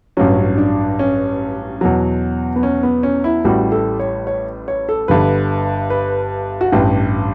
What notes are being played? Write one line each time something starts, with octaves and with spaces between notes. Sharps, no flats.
A1 G2 F#3 C#4
D4
C#4
E2 B2 F#3
B3
C#4
B3
C#4
E4
A1 A2 G3 F#4
A4
C#5
C#5
C#5
A4
G1 G2 D3 B4
B4
F#4
A1 G2 E3 G4